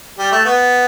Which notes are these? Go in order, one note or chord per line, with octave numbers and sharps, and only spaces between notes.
G3
A3
B3